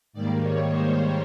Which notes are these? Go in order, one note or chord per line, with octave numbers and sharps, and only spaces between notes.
G#2 D#3 G3 A#3 D5
C#5
C5